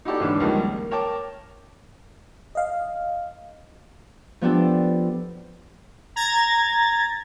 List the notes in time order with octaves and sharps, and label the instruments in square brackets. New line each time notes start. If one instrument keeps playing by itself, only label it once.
[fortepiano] D#4 E4 F#4 G4 A4 D5
G#2 D3 E3 C#4 B4 D6
C#2 D#3 F3 G3 G#3 A#4
A#3
A#4 C#5 G5 A5 D6
[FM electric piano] D#5 F5
[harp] F3 B3 D4 G4 A4
[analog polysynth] A#5 G#6 A6